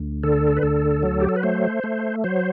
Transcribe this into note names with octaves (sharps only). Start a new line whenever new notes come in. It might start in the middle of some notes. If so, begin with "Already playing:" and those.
Already playing: D2
D3 A4
B4
D2 A4
F#3
G4
A4
B4
A3 C5
A3
F#3 C5